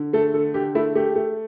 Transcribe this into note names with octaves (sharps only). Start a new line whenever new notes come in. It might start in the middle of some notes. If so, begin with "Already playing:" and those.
Already playing: D3
A3 A4
D3 A4
D3 G4
A3 E4
A3 G4
A3